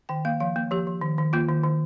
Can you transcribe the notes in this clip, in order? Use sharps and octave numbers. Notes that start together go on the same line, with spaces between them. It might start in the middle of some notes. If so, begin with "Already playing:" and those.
D#3 G5
A#3 F5
F3 F5
A#3
F3 G4
F3
D#3
D#3
A#3 F4
D#3
D#3